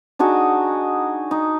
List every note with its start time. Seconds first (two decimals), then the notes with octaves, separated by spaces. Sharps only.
0.19 D4 D#4 F#4 G#4
1.31 D#4